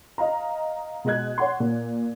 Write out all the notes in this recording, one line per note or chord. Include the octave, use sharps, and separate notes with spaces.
D#5 F5 A#5
B2 G#3 D#5 F#6 G#6
C#5 F#5 C6
A#2